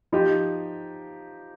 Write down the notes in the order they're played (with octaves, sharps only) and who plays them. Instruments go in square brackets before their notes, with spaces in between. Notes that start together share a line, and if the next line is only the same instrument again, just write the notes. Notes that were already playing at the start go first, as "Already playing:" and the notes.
[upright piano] F3 D#4 G4